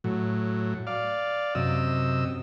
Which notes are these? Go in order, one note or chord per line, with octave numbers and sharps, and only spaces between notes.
A2 F#3
D5 F5
F#2 C3 D#5 E6